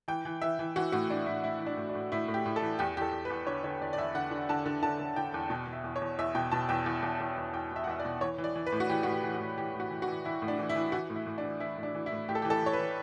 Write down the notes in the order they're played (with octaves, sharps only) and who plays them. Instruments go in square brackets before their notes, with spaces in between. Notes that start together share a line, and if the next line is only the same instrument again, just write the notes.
[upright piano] E3 G5
E3
E3 E5
E3
E3 F#4
A2 F#4
E3 D4
A2 E4
A2 E4
E3
D4
A2
D4
A2
A2 E4
A2
G4
A2
A4
E3
E2 G4
E2 G4
A4
E2
B4
E2
D3 C#5
D3 C#5
E2 D5
D5
E2 E5
D3 F#5
D3
D3 A5
D3
D3 A5
D3
D3 G5
E2
B2 G5
E2
E5
E2
C#5
E2
E2 E5
B2 G5
B2 A5
E2 G5
E2
E2
E2
E2
E2 G5
E2 E5
F#5
E2 E5
D5
B2
E3 C#5
E3
D5
E3
B4
A2
F#4
E3 G4
A2 F#4
G4
E3
F#4
A2
E3 G4
A2
F#4
E3
F#4
E3
E3 E4
A2
D4
E3
E4
E3
E3 F#4
A2
E4
A2
D4
E3
E3 E4
A2
D4
E3
E4
A2
A2 G4
A4
G4
E3
A4
E3 C#5
B4
E3